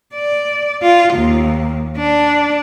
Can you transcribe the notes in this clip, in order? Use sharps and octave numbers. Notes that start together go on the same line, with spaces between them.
D5
F4
D#2
D4